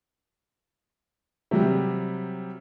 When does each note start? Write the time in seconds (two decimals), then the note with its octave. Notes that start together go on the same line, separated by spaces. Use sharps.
1.51 C3 F#3 G3